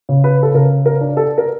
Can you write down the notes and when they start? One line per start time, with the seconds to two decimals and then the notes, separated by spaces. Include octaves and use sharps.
0.09 C#3
0.24 B4
0.43 A4
0.54 C#3 A#4
0.86 A#4
1.01 D4
1.17 A4
1.38 A#4